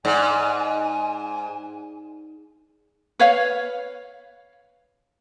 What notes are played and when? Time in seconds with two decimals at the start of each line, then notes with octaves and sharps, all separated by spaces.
0.05 G#2 D5 G#5
3.20 B4 C#5 F5